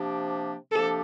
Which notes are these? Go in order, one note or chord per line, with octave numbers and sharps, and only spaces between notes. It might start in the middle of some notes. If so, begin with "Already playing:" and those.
Already playing: C3 F3 A#3 D4 G4
C3 F3 A#3 D4 G4 A4